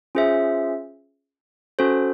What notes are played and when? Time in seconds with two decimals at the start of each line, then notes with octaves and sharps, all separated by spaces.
0.15 C#4 F4 G#4 C5 E5
1.79 C#4 F#4 A4 C5